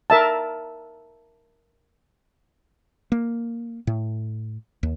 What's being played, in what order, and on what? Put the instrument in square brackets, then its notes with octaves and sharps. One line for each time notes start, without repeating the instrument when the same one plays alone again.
[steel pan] A#4 E5 A5
[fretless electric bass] A#3
A2
D#2